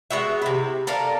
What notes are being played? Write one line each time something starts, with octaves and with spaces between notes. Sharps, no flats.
G#3 B3 F#4 E5
C3 E4
A4 A#4 D5 F5